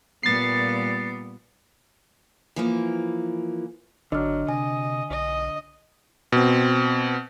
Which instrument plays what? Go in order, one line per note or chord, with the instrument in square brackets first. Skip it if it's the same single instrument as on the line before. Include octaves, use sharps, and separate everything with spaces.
[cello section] A#2 G3 [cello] B3 [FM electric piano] A6 C7
[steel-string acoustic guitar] E3 F3 A#3
[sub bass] G#1 [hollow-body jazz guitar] D3 [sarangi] F#3 [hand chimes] D#5 F6
[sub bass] C3 [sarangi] D#5 [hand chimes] G#5
[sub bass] B1 [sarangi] D#5
[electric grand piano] B2 C4